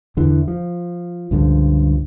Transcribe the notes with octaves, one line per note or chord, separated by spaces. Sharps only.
E2 D3 E3
F3
C#2 G2 D3 F3